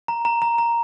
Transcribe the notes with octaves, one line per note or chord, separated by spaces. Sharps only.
A#5
A#5
A#5
A#5